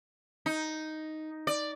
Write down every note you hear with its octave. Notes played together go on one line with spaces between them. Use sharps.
D#4
D5